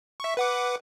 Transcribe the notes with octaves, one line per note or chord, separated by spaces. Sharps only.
E5 C#6
B4 F#5 D6